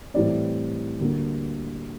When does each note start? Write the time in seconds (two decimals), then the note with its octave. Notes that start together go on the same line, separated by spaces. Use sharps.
0.14 A2 E3 G3 C4 D5
1.01 D2 D3 G3 A#3